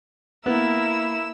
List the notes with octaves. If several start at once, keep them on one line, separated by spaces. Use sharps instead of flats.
A#3 B3 E4 A#4 E6